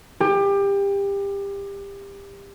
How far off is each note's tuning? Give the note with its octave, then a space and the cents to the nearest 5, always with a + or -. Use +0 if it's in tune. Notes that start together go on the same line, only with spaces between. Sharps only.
G4 +25